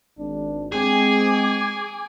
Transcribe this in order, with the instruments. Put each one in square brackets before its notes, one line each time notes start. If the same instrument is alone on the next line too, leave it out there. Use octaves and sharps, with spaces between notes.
[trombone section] G#1 D4
[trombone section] G#3 C4 [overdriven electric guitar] G#4 [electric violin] G#5 D6